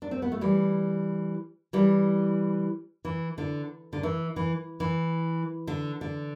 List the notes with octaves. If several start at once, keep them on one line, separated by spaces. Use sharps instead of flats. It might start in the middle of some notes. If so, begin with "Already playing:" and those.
D4
C4
B3
A3
E3 G3
E3 G3
E3
D3
D3
E3
E3
E3
D3
D3